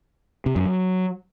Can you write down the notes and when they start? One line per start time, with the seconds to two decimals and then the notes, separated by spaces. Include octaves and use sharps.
0.46 C3
0.56 F#2
0.65 F#3